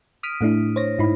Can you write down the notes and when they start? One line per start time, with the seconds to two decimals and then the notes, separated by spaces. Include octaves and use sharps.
0.23 D#6 F6 B6 D7 D#7
0.41 A2 A3 D4 E4
0.76 C5 C#5 A#6
0.99 G#2 D#4 E4 B5